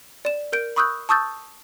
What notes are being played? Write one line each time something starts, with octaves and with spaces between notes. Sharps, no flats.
D5 E7
A#4 G6 D7
B5 C#6 D#6 E6 F#6 G6
A5 C#6 D#6 E6 G6 A6